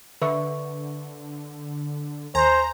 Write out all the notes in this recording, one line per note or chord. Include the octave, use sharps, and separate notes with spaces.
D3 B4 E5 C#6
D#2 C5 G#5 A#5